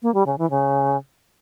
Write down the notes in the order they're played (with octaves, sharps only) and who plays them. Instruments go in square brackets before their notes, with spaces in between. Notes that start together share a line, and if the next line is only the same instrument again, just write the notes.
[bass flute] A#3
G3
C#3
E3
C#3